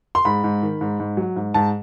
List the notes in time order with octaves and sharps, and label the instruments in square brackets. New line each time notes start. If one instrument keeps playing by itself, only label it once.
[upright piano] C6
G#2 B5
G#2
D#3
G#2
G#2
F#3
G#2
G#2 A5